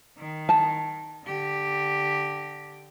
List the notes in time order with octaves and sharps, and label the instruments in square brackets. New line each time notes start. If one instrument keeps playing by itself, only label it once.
[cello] D#3
[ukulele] A5
[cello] D3 G4